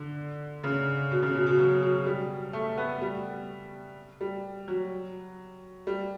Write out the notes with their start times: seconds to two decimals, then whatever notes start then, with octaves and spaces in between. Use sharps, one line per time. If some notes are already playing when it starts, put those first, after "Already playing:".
Already playing: D3
0.64 C#3
1.11 B2
1.23 C#3
1.35 B2
1.46 B2
1.59 F#3
1.83 F#3
2.06 G3
2.53 A3
2.78 B3
3.01 G3
4.21 G3
4.68 F#3
5.87 G3